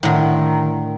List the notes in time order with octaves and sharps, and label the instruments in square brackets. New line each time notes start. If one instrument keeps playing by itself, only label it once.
[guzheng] A2 D3 [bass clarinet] D#3